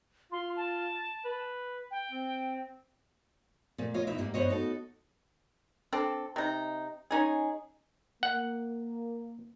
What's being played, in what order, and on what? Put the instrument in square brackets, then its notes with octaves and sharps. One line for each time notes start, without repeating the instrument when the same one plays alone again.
[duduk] F4 [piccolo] C6
[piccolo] A5
[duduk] B4
[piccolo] G5
[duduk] C4
[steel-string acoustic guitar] A#2 A3
F4 C#5 D#5
E2 B2 D#4 E4 E5
G#2 G3 A#3
G2 B3 C5 C#5 D#5
D#4 F#4 A4
[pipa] C4 D4 A4
C3 D#4
C#4 D#4 G#4
[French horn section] A#3 [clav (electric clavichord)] F#5